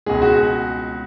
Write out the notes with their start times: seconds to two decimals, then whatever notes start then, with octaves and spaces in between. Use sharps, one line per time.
0.06 C#2 B2 G#3 G#4
0.22 F#4
0.37 G#4